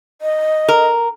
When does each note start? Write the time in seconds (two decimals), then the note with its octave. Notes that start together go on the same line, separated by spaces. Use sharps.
0.22 D#5
0.68 A#4